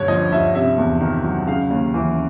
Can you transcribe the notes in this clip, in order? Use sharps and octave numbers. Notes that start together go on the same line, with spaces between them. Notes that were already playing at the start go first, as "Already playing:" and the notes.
Already playing: G2 D3 C#5
F3 D#5
G2 E5
C3 E5
E2
D#3
F#3
C#3 F5
D#2
E3